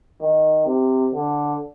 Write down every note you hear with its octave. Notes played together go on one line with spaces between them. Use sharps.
D#3
C3
D3